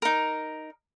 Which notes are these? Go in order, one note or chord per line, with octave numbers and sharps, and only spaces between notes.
D#4 A#4